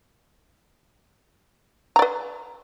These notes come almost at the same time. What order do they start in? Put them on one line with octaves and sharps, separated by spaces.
A#5 D5 B4